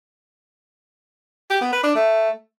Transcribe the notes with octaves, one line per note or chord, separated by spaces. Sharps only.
G4
B3
B4
D4
A3